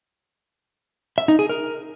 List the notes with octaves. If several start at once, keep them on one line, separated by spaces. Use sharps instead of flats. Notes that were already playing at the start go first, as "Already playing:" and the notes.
E5
D#4
G#4
A#4